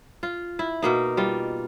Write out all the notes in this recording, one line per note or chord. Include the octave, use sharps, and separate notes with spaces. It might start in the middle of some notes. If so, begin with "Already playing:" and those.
F4
E4
B2 A#3 D#4
G3 F4